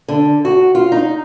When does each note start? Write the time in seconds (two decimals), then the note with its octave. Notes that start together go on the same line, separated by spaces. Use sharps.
0.08 D3
0.45 F#4
0.75 F4
0.92 D#4